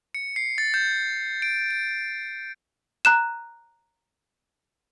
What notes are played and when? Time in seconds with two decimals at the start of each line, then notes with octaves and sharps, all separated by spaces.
0.14 C#7
0.36 C7
0.58 A6
0.74 G6
1.42 D7
1.71 D7
3.05 A#5 F#6 E7